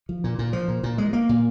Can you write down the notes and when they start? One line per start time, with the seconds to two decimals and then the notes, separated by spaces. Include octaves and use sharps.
0.09 F3
0.24 A#2
0.39 A#2
0.53 F3
0.68 A#2
0.83 A#2
0.98 G#3
1.13 A#3
1.29 A#2